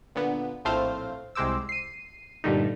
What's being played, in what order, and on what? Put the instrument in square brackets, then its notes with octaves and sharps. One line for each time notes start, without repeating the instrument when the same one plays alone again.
[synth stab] A#2 D3 B3
A#1 A2 A3 C4 C5 F5
C2 C3 G#3 C5 D6 E6
C7 D#7
G2 A#2 D3 G3 A3 D#4